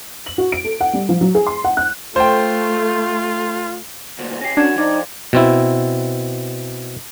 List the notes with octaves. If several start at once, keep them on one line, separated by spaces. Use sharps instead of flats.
F#7
F#4
D7
A4
F#5
G3
F3
F#3
G#4
C6
F#5
F#6
A3 F4 C5 G5
D2 A#2
C#4 G4 A#6 C7
F#2 C#4 D4 F#4 G#6 E7
F2 D#4 D5 D6 G#6
B2 C4 E4